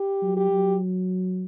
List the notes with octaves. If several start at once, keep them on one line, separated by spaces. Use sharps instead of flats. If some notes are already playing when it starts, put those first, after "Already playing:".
Already playing: G4
F#3
G4
F#3